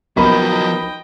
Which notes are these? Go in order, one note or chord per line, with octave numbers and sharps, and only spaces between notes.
F3 F#3 B3 D#4 A#4 D#5 G5 B5